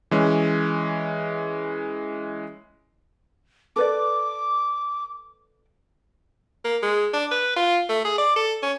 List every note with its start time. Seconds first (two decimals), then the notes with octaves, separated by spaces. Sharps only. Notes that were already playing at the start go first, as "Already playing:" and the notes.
0.11 E3 G#3 C#4
3.76 A4 B4 D5 D6
6.65 A#3
6.83 G#3
7.14 D4
7.31 B4
7.56 F4
7.89 A3
8.05 G#4
8.18 D5
8.36 A4
8.63 C#4